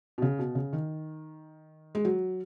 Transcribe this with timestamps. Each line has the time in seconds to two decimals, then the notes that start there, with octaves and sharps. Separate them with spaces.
0.18 B2
0.22 C#3
0.39 B2
0.55 C#3
0.73 D#3
1.95 G#3
2.05 F#3